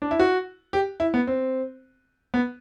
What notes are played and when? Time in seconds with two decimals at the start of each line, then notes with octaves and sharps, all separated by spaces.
0.02 D4
0.11 E4
0.20 F#4
0.73 G4
1.00 E4
1.14 B3
1.27 C4
2.34 B3